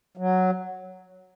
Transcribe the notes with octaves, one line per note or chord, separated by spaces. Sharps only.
F#3